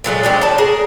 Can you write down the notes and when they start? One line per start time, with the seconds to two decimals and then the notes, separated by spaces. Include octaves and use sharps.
0.04 A#2 F#3 G#3 A3
0.23 G#3 D4 G4
0.41 C#5 A5
0.58 G#4 A#4